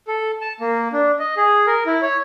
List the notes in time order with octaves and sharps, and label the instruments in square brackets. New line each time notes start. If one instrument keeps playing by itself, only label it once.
[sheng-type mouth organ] A4
A5
A#3
D4
D#5
G#4
A#4
E4
C#5